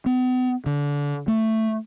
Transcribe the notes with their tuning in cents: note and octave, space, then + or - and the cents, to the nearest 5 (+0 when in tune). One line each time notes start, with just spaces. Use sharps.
B3 +40
D3 -25
A3 +10